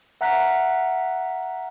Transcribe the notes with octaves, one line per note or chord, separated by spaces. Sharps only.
E5 F#5 A#5 F6 F#6 B6